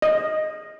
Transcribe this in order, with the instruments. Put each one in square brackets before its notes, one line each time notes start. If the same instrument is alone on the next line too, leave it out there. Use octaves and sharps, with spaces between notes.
[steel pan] D#5